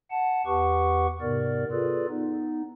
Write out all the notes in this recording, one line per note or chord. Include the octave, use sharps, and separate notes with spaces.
F#5 A5
E2 G4 B4 F#5 C#6
G#2 C3 B3 A#4 D5
F4 G#4 A4 B4 D5
B3 D#4